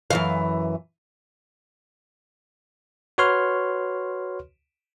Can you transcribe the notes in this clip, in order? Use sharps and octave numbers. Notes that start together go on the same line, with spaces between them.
F#2 E3 F5
F#4 B4 C#5 C6 F6